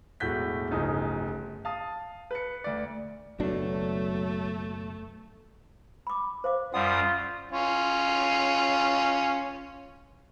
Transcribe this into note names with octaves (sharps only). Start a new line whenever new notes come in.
E1 A2 A3 F#4 G6 B6
D1 G1 C#3 F3 D#4
F5 A5 D#6
B4 C#7
D2 D5
F#1 B2 F#3 A3 D4
B5 D6
C5 F5 D6
F#2 G3 F4 F#5 D#6
C#4 F4